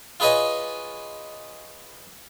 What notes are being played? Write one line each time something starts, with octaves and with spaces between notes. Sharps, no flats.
F4 G#4 B4 C#5 D#5 G#5